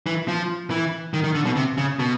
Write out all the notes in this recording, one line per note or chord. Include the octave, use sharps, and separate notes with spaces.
E3
F3
E3
D#3
D#3
D3
B2
C3
C#3
B2